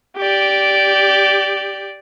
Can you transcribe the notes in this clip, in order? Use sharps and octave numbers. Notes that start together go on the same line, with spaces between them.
G4 D5